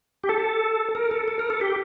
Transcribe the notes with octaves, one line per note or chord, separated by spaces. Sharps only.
G4
A4
A#4
A4
A4
A#4
A4
G4